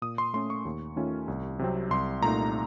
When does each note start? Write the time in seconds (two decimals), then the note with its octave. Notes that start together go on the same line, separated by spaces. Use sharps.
0.02 A#2 D#6
0.18 C6
0.34 A3 C#4 C6
0.50 C#6
0.65 D#2
0.96 D#3 A3 C#4 F4
1.28 C2
1.59 C3 F#3 C4
1.91 C2 C6
2.22 A#2 A3 D#4 A#5